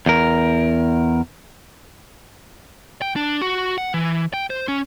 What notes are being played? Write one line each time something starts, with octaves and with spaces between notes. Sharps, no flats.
E2 A#4
G5
D4
F#4
F#5
E3
G5
C5
C#4